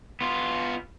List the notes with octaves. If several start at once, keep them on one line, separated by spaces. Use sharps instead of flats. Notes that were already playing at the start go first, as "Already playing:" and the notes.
B3 F4